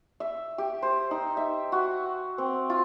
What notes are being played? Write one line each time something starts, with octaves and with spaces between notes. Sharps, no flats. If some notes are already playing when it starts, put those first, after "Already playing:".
E5
G4
C5
D#4
E5
F#4
C4
F4